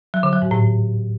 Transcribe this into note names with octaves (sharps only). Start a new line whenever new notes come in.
F#3
D3
F#3
G#2
A2